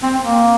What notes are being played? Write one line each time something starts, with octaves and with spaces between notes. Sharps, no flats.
C4
A#3